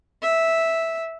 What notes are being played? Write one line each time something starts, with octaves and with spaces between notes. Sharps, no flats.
E5